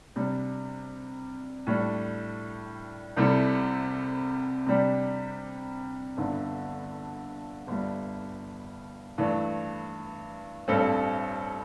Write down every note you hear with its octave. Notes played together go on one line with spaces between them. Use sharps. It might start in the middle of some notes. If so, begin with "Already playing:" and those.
C3 G3 D4
A2 G3 D4
C2 C3 G3 E4 A4
C3 G3 D4 G4
G1 G2 D3
G1 G2 G3
G2 E3 A3 D4
A1 G2 G3 C4 A4